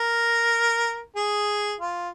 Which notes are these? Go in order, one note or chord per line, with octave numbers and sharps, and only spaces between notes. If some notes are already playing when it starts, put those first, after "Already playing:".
Already playing: A#4
G#4
F4